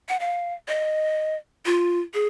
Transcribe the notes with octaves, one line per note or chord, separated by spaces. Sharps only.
F#5
F5
D#5
F4
G#4